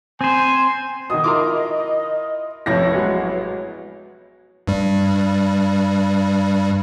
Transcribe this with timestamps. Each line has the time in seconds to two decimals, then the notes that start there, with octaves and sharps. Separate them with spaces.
0.21 C4 C5 G#5
1.10 B2 D#3 D#5 D#6
1.24 E4 F4 A#4 A#5 C6 D6
2.66 A1 F2 A2 E4 C#5 A#6
2.92 F#3 G#3 B3
4.67 G2 G3